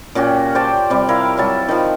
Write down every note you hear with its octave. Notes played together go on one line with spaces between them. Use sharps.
A#2 C#4 F#4 G4
C5 D5 G5 A5
C3 G3
E4 A#4 F5
F#3 G3 A5
D#3 F3